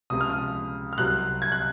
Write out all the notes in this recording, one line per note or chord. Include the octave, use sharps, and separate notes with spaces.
C#2 C3 F3 D#6
F6
D#6
F6
C2 C3 F#3 F#6
G#6
F#6